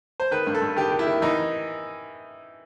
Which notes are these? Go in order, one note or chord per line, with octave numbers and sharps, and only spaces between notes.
C5
D#3 B4
G2
A4
G2
D#3 G4
D#3
E4
D#3
E3 D#4